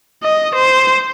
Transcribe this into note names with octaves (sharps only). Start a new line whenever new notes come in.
D#5
C5